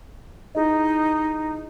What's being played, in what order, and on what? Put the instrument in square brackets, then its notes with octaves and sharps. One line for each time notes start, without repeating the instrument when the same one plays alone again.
[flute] D#4 [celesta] E4 G#4 D#5